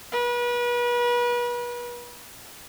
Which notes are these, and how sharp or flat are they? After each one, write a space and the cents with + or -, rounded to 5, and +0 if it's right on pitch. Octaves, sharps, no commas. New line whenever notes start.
B4 -35